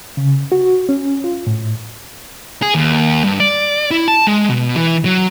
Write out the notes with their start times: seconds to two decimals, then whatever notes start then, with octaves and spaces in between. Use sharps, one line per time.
0.17 C#3
0.52 F#4
0.89 C#4
1.24 F4
1.47 A2
2.62 G#4
2.75 D#2
3.24 G2
3.40 D5
3.91 E4
4.08 A5
4.27 G#3
4.50 B2
4.76 E3
5.05 F#3